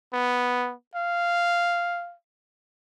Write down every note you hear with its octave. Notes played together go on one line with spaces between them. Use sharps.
B3
F5